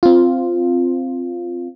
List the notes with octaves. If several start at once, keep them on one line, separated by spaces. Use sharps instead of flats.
C4 F4